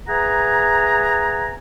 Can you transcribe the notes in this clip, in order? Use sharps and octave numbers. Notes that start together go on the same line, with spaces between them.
G#4 B4 E5 F#5 G#5 A#5